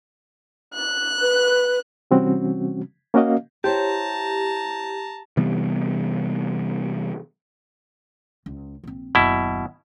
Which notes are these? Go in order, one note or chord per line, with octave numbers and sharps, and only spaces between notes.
F#6
B4
C3 E3 G3 C4 C#4 F#4
A#3 C#4 F#4 A#4 D#5 F5
E4 G4 C5 C#5 A5 A#5
C3 E3 G3 B3
C#2
A#1 C4
F#1 D#2 B2 E4